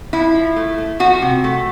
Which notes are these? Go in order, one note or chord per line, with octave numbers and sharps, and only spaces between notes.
F3 E4
F3
A3
A3
F3 F#4
C3
A3